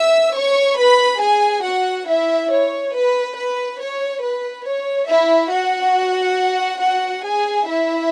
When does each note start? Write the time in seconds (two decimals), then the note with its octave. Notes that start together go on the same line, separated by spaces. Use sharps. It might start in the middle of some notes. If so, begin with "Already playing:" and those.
Already playing: E5 E6
0.35 C#5 C#6
0.77 B4 B5
1.20 G#4 G#5
1.64 F#4 F#5
2.07 E4 E5
2.50 C#5
2.94 B4
3.36 B4
3.79 C#5
4.22 B4
4.65 C#5
5.08 E4 E5
5.51 F#4 F#5
6.80 F#4 F#5
7.23 G#4 G#5
7.67 E4 E5